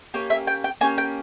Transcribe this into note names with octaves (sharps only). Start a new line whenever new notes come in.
A#3 C#4 G4
E5
G5
G5
A#3 C#4 G4 G#5
G5